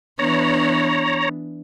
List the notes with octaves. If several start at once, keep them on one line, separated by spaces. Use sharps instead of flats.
E3 B3 D4 C#5 A#5